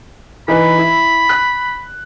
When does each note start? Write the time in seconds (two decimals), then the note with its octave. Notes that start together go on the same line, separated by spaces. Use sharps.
0.48 E3 D#4 B4 B5
0.78 E4
1.29 F#6